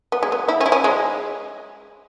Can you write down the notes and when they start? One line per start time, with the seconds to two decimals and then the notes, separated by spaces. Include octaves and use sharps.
0.12 B3
0.23 G#3
0.32 B3
0.48 E4
0.61 C#4
0.66 E4
0.72 C#4
0.84 G#3